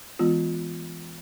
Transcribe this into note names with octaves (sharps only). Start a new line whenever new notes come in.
E3 G#3 B3 F4